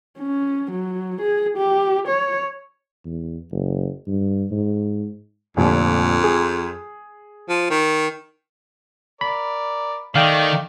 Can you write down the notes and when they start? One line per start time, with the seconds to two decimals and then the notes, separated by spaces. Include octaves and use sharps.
0.19 C#4
0.71 F#3
1.21 G#4
1.57 G4
2.07 C#5
3.05 E2
3.51 F#1
4.07 G2
4.51 G#2
5.57 F1 F2 A#2 D3
6.24 G#4
7.49 F3
7.70 D#3
9.21 A#4 D5 B5
10.16 D#3 A3 D5 D#5 F5 G5